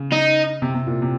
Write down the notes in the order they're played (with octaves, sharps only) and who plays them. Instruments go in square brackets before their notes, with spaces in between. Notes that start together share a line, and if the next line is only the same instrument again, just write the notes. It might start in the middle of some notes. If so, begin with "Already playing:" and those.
Already playing: [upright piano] C#3
[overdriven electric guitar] D#4
[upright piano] C3
C3
A#2
C3